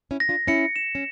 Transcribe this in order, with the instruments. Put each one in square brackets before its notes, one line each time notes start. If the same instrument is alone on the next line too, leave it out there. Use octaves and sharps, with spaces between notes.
[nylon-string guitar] C#4 E4
[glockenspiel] A#6
[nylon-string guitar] D4 F4
[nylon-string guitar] C#4 E4 [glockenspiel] C#7
[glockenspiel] E7
[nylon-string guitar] C#4